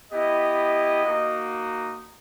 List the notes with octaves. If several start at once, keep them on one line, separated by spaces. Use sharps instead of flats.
B3 E4 G4 D#5
A#3 D#4 F#4